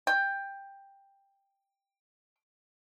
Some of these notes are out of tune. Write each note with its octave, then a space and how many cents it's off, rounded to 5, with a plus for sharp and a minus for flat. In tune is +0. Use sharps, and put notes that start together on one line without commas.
G5 +10